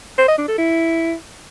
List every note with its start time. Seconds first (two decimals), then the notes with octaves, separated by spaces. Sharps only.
0.18 C5
0.28 D#5
0.38 D4
0.48 A4
0.58 E4